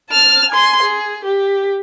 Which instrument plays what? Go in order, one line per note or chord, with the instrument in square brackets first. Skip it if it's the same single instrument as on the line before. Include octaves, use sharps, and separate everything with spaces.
[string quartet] A5 F6
G#5 C6
G#4
G4